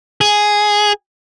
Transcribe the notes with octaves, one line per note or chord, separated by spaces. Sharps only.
G#4